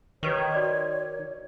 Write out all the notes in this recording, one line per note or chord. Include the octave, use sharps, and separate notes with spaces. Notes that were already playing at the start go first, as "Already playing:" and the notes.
D#3 G4 B4 C#5 C#6
F#4 D5 D6